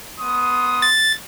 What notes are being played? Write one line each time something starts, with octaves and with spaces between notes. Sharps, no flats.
B3 C6 D#6
A6